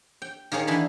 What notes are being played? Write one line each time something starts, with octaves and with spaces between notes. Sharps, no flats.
G5
D#3 A#3 G#4 C#5
D3 E3 G#4 A5 B5